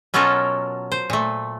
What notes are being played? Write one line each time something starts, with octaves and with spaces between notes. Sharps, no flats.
B2 F#3 C#4 F4 A4 A#4
C5
A#2 A3